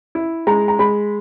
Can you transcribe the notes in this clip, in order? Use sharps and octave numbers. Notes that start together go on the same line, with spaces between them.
E4
G#3 A#5
A#5
G#3 B5